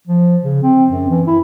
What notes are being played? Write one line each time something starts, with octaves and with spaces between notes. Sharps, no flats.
F3
C#3
C4
F#2
E3
E4